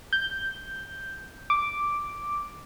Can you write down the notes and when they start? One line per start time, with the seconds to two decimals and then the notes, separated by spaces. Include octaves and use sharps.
0.13 G6
1.50 D6